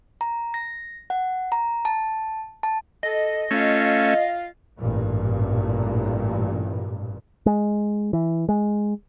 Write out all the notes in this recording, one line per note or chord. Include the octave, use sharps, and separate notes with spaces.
A#5
A#6
F#5
A#5
A5
A5
A4 D#5
A3 C#4 F4 F5
A1 G2 A#2
G#3
E3
G#3